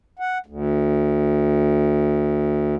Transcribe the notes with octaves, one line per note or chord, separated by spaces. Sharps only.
F#5
D2